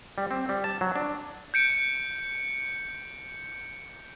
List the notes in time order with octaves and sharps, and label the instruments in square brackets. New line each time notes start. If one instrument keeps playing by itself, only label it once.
[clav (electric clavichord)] G3
C4
G3
A5
F#3
D4
[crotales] G6 C#7 D7